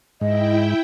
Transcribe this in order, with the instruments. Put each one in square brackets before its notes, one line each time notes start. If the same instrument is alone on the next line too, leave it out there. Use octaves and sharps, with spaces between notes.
[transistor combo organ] G#2 [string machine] E4 G5 [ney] D#5